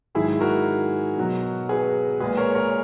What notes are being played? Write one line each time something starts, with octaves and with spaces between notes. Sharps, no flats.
G#2 D#3 F#3 E4 G#4
F#4 A#4
B2 F#3
G#4 B4
A#2 G#3 G#4 B4
A#4 C#5
A#4 C#5